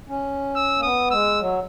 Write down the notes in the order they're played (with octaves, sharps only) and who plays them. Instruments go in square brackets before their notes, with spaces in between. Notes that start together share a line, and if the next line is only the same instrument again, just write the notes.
[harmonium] C#4
[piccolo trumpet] E6
[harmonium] A#3
[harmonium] B3 [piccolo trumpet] D#6
[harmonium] G#3 [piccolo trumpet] E6
[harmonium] F#3